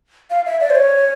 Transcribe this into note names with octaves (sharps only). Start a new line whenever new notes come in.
F5
E5
D5
C5
C#5